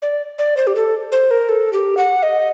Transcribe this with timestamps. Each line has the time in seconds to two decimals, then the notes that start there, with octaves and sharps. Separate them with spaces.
0.02 D5
0.38 D5
0.57 C5
0.67 G4
0.75 A4
1.12 C5
1.31 A#4
1.49 A4
1.73 G4
1.97 F#5
2.23 D#5